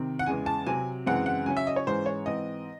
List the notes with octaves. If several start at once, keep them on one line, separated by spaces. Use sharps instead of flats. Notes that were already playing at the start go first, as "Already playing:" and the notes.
Already playing: C3 D#3 C4
F#5
E2 C#3 G#3 G#5
A5
C3 F#3 C4 G#5
F#2 C#3 E3 G#3 C4 F#5
F#5
C#3 F#3 C#4 G#5
E5
D#5
C#5
G#2 E3 G#3 C#4 C5
C#5
G#2 E3 C4 D#5